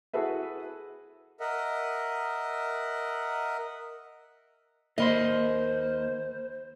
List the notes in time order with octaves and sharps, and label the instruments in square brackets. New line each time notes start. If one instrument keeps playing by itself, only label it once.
[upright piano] E4 F#4 G#4 A4 B4 E5
[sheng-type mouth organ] A#4 D#5 E5 F#5
[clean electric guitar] D#2 A#4 C6 [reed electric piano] A#3 B5 [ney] C5 [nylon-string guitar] D#5